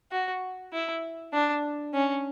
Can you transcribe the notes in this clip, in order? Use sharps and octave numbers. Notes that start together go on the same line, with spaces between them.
F#4
E4
D4
C#4